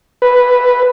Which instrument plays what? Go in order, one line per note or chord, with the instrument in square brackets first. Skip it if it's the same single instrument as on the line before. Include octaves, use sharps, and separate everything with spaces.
[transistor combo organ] B4